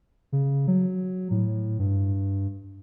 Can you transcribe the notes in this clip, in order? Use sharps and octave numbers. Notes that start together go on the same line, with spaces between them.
C#3
F#3
A2
G2